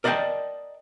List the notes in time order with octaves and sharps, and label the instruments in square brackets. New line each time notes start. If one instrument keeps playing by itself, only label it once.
[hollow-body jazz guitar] A#4 D5 D#5 F5 G5 A5